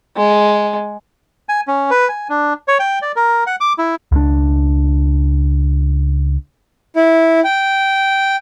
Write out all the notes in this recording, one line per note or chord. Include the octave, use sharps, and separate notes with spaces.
G#3
G#5
C#4
B4
G#5
D4
C#5
G5
D5
A#4
F#5
D6
E4
C#2 D4
E4
G5